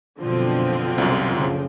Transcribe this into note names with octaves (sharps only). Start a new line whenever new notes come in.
F#1 B2 D3 F3 C4
C2 F#2
F#1 C#3